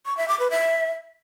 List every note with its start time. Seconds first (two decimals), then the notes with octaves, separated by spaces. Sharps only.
0.06 C#6
0.17 E5
0.28 D6
0.39 B4
0.51 E5